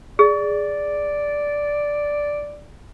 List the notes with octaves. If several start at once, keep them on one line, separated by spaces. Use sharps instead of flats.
G#4 D5